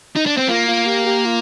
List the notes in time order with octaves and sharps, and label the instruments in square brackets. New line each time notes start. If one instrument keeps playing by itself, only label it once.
[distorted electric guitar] D#4
D4
C4
[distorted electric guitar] A#3 [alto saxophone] F4
[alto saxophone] F4
G4
G4
F4